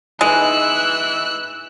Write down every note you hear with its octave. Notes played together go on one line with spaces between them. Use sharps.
E3 G#3 D#4 B4 E6 F#6